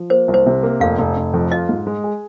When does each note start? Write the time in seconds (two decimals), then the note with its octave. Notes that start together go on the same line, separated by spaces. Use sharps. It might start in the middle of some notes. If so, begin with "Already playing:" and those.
Already playing: F3
0.10 A#3 C5
0.28 C2
0.34 C5
0.46 C3
0.63 A#3
0.80 F1 F5
0.98 F1
1.17 F1
1.34 F2
1.51 F4 D#5
1.69 G#2
1.87 G#3
2.04 G#4